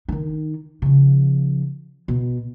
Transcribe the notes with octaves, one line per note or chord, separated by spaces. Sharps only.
D#3 D#4
C#3 F3
B2